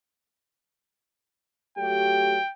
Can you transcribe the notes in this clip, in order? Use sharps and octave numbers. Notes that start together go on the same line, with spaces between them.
F#3 A3 G4 G5